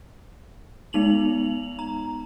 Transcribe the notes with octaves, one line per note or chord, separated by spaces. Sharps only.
G#3 B3 D#4 F7 F#7
A#5